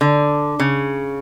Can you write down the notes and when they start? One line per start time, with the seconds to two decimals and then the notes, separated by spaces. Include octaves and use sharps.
0.01 D3
0.60 C#3